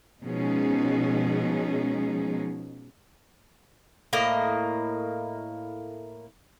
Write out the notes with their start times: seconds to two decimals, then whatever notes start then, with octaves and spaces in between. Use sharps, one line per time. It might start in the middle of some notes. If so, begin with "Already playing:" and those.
0.22 B2 F3 G#3 C#4 D#4 G#4
4.13 A2 A#3 A#4 D#5